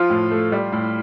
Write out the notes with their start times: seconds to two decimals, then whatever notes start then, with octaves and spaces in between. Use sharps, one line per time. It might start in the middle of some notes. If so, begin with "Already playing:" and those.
Already playing: F3 F4
0.10 A2
0.31 A3
0.52 G3
0.72 A2